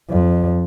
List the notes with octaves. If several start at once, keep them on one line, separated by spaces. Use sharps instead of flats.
F2